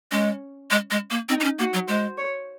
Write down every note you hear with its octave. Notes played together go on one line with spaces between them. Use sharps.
G#3 C#4
G#3
G#3
A#3
C4 D#4
D#4
C#4
A#3 F#4
F#3
G#3 C5
C#5